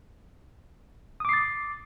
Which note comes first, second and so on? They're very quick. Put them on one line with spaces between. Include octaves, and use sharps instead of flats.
D#6 D6 C7 A6